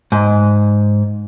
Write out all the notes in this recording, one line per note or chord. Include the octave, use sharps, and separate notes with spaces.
G#2